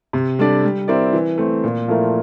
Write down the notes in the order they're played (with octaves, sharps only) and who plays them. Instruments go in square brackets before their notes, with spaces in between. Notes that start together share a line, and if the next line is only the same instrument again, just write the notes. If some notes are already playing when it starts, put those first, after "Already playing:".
[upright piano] C3
G3 D4 A4 D5
G3
C4 E4 A#4 D5
E3
A3 C4
A#2
F3 A3 E4 A#4